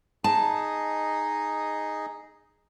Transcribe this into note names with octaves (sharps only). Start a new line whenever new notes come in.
D#4 G#4 D#5 A5